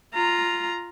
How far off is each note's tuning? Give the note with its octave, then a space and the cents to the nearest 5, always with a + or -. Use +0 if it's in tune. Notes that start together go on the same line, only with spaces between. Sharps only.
F4 +0 A#5 +0